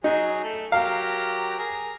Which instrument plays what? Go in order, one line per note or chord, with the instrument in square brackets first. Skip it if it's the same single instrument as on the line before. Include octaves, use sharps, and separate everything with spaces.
[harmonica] F#3 G#4 [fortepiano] D#4
[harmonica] A3 A4
[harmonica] F#3 G4 A#4 [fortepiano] F5
[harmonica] G#4 A#4